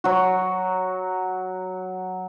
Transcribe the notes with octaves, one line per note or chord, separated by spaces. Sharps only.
F#3 F#4